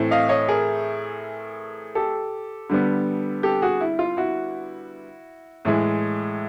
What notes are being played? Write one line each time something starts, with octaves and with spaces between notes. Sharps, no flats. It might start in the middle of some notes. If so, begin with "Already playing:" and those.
Already playing: A2 E3 A3 C4 E4
D#5 F5
C#5 D#5
G#4 A#4
G4 A4
D3 G3 B3
G4 A4
F#4 G#4
E4
F4
E4 F#4
A2 E3 G#3